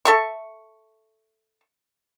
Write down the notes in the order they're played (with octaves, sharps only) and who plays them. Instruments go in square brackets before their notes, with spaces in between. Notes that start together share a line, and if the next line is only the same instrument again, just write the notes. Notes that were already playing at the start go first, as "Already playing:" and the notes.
[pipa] A4 E5 C#6